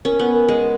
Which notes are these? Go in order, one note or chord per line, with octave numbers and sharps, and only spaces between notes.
C#4 A#4
B3
A#4
G#3